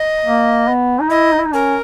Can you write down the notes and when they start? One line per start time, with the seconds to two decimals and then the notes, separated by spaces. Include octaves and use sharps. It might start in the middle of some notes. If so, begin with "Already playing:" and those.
Already playing: D#5
0.25 A#3
0.68 B3
1.01 D#4
1.10 E4 D#5
1.32 D#4
1.39 E4
1.46 D#4
1.53 C#4 A#4